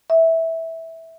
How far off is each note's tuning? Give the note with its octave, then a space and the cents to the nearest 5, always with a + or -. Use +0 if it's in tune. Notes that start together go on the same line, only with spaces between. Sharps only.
E5 -10